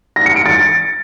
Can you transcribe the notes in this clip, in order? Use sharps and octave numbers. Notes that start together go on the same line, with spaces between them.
A#6
C#7
D7
A6